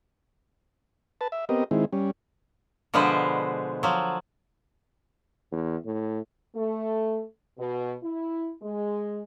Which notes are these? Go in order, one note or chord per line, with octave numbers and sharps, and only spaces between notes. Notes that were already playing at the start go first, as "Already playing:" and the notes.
B4 A5
E5
B3 C4 G4 A#4 D#5
D#3 G#3 C4 E4
G3 C#4
B2 D3 F3 G#3 B4 C5
F3 F#3
E2
A2
A3
B2
E4
G#3